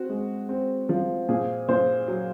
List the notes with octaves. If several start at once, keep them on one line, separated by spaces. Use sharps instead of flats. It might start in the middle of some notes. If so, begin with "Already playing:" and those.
Already playing: C4 F#4
G#3
C4
F3
A#2 G#4
A#2 C5
F#3